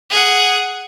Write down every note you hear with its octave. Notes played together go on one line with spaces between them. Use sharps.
G#4 F#5